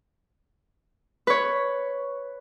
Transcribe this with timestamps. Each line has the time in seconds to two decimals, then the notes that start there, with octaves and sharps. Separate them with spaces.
1.27 B4 C#5